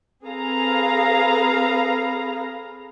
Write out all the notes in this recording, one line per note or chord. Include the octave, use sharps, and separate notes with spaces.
C4 G#4 A4 B4 F5 A#5